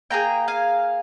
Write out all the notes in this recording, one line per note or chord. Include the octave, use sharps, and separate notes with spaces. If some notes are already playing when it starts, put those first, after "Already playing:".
A#3 F4 G#4 G5 A#5
F5 G#5